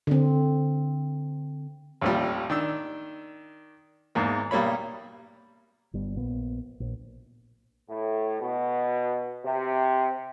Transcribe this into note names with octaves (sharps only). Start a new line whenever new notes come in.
D3 C4
A1 D#2 F3 G3
D#3 D4 E6
E2 G#2 A#3
B1 G3 A#3 C#5 B5
G1 G3 B3
A#1 B3
A#1
A2
B2
C3